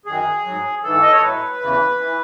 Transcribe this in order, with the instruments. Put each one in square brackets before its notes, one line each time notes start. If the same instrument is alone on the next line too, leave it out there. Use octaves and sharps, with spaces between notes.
[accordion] F#2 D#3 F#3 G#4
G#2 F#3
G#2 E3 A4
D#5
C#5
A2 F#3 B4
E2 C#3 E3
E3